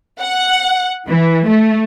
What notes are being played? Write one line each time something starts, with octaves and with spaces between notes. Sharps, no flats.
F#5
E3
A3